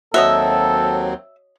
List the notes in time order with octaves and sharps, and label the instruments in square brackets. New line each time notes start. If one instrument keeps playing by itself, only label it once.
[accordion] D#2 F#3 C4 [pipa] F#4 C#5 D#5 [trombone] A4 [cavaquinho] E5